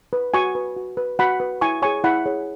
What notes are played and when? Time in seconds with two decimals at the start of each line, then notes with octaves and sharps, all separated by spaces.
0.13 B4
0.34 F#4 G#5 C#6
0.55 B4
0.76 F#4
0.97 B4
1.19 F#4 F#5 B5
1.40 B4
1.61 E4 G#5 C#6
1.82 G#4 C#5 G#5 C#6
2.04 E4 F#5 B5
2.26 G#4 C#5